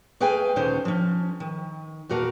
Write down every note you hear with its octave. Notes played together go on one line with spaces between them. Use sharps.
A3 G#4 B4 F5 G5 G#5
D2 A#2 D3 D#3 C#4 C5
F3 C#4
D#3
E2 A#2 F#4 A#4 F5 A5